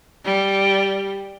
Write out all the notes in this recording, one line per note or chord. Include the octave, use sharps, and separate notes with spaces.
G3